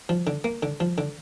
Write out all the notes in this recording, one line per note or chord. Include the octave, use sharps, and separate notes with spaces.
F3
D3
A#3
D3
F3
D3